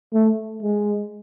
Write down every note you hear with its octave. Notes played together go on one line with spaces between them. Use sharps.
A3
G#3